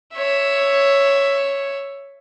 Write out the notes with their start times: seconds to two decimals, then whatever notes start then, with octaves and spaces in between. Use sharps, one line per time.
0.14 C#5 E5